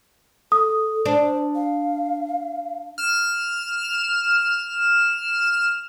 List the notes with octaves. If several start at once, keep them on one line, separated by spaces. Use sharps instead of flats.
A4 D#6
D4 C5
F5
F6 E7